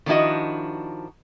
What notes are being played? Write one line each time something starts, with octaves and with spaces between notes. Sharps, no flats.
D#3 F3 D4 E4 F#4 D#5